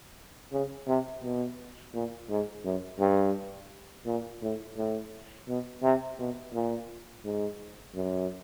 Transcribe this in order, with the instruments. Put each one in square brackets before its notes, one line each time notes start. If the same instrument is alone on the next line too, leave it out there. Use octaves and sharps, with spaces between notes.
[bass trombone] C#3
C3
B2
A#2
G#2
F#2
G2
A#2
A2
A2
B2
C3
B2
A#2
G#2
F#2